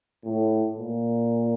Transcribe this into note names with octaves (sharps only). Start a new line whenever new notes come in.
A2
A#2